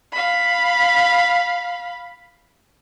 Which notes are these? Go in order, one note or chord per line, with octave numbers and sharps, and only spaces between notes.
F5 B5